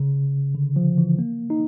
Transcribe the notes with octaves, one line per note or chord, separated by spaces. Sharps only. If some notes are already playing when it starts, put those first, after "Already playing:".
Already playing: C#3
D3
F3
E3
A#3
D#4